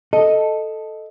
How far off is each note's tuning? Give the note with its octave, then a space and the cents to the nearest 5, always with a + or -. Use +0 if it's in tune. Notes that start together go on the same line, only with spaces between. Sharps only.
A4 +0 D#5 +0